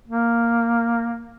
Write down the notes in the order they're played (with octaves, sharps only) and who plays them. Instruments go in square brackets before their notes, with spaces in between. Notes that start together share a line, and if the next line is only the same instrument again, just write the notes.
[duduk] A#3